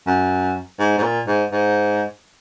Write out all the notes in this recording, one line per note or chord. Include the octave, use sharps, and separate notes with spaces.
F#2
G#2
G#2
A#2
G#2
G#2